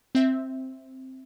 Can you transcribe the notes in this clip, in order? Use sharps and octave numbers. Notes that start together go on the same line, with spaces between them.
C4 E5